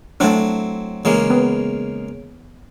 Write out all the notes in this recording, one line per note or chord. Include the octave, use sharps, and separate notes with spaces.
F#3 A3 C4 D4 E4
C#3 E3 G#3 A#3
B3